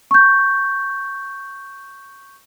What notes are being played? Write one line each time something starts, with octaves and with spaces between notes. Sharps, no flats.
C#6 G6